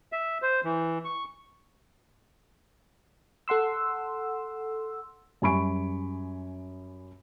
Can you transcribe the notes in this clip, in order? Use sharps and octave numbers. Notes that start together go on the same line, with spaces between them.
E5
C5
E3
C#6
A4 F#5 C6 E6
F#2 G3 G#5 B5 C#6 D7